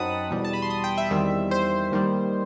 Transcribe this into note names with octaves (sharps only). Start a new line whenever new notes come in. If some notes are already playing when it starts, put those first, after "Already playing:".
Already playing: F#2 F#3 C4 D#4 F#5 A5 B5 D#6
E2 B2 G3
A5
B5
C6
D#6
G5
E5
E2 D#3 G3 C4
C5
D#2 D#3 G3